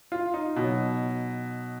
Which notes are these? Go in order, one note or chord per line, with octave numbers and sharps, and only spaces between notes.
F4
D#4
B2 F#3